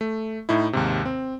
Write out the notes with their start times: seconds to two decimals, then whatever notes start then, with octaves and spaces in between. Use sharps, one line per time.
0.01 A3
0.49 A2 D#4 E4
0.73 D#2 G#2 C3
1.05 C4